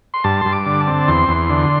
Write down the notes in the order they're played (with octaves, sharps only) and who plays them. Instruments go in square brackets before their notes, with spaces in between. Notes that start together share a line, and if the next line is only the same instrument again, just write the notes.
[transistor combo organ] C6
G2 A5
G2 C6
D6
D3
A5
C4
E2 C6
E2
D3